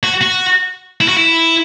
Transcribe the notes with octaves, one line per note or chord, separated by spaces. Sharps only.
F#4
F#4
E4
F#4
E4